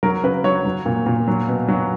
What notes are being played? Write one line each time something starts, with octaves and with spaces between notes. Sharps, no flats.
F#3 A#4
C#3 B4
F#3 C#5
F#3
A#2
A#2
F#3
B2
F#3